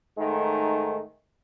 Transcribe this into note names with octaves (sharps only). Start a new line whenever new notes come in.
G#2 D#3 A3